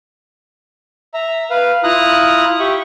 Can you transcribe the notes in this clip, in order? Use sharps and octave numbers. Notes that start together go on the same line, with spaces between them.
E5 A#5
B4 F5
E4 F4 A#5 D#6 F#6
G4 E5 C#6